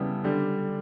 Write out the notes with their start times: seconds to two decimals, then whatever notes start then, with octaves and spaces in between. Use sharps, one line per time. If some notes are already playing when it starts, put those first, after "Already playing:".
Already playing: C#3 G3 B3 E4 A4
0.24 D3 G3